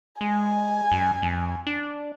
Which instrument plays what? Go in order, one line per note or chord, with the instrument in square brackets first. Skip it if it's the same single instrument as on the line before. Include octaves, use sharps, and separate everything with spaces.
[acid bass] G#3 [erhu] G#5
[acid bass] F#2
F2
D4